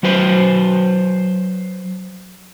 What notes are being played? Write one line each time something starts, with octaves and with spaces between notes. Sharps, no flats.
F#3 F#4 B4 C5